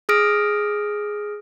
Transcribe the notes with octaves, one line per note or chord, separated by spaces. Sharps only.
G#4 D#6 F6 A#6 D7